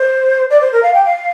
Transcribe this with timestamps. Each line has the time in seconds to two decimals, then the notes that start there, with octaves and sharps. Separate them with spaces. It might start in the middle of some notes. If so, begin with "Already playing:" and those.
Already playing: C5
0.50 D5
0.61 C5
0.72 A#4
0.82 F5
0.94 G5
1.05 F5